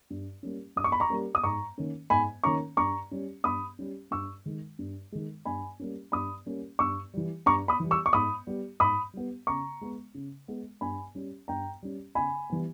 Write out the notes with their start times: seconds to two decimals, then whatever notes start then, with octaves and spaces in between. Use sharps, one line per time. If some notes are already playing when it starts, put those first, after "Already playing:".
0.10 G2
0.43 G3 A#3 C#4
0.76 G2 D#6
0.84 C#6
0.92 B5
1.00 A#5 C#6
1.10 G3 A#3 C#4
1.35 D#6
1.43 G#2 A#5 C#6
1.78 D#3 A#3 C#4
2.10 G#2 G#5 B5
2.44 D#3 A#3 C#4 A#5 C#6
2.77 G2 A#5 C#6
3.11 G3 C#4
3.44 G2 B5 D#6
3.79 G3 C#4
4.11 G2 C#6 E6
4.46 D#3 G#3
4.79 G2
5.12 D#3 G#3
5.45 G2 G#5 B5
5.80 G3 A#3 C#4
6.12 G2 B5 D#6
6.46 G3 A#3 C#4
6.79 G2 C#6 E6
7.14 E3 G3
7.46 G2 A#5 C#6
7.68 B5 D#6
7.80 E3 G3
7.91 C#6 E6
8.06 C#6
8.13 G#2 B5 D#6
8.47 G3 B3
8.80 G#2 B5 D#6
9.13 G3 B3
9.47 C#3 A#5 C#6
9.81 G#3 B3
10.15 C#3
10.48 G#3 B3
10.81 G2 G#5 B5
11.15 G3 C#4
11.48 G2 G5 A#5
11.83 G3 C#4
12.15 C#3 G#5 B5
12.50 E3 G3 B3